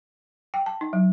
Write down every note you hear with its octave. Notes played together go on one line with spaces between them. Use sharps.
G5
A5
D#4
F#3